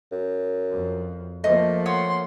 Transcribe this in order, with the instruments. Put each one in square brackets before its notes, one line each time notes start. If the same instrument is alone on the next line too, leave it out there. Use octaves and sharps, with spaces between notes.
[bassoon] F#2
[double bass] F2
[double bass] F3 A#3 [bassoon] A3 [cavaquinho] D#5
[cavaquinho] C#5 D#6 [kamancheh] F#5 C6